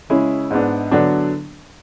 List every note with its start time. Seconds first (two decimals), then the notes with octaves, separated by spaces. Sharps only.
0.10 C#3 G#3 C#4 E4 G#4
0.51 G#2 G#3 B3 D4
0.91 D3 F#3 B3 D4